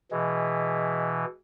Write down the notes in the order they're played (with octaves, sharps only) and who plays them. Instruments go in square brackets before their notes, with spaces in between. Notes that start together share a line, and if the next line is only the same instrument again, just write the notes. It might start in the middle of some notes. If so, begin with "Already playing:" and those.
[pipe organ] B2 E3 [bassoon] G#3